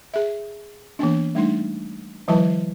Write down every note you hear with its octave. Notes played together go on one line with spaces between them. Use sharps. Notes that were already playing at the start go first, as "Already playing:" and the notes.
G#4 E5
E3 A#3 B3 D4
G3 A3 D4 D#4
D#3 F3 G3 E4 B4 A5